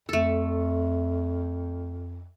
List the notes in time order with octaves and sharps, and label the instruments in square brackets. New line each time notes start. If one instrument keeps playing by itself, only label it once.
[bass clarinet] F2 [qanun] A3 A4